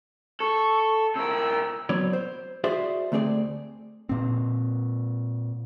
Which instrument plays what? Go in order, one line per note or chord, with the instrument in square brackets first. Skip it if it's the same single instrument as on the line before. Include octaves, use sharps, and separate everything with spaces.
[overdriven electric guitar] A4 [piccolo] C#6
[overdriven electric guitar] C3 A#4 [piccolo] E6
[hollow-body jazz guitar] F#3 B3 C4 C#5 D5
C5
F#4 G#4 C5 D5 E5
D2 A3 C4 G#4 D5
[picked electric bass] A#2 C4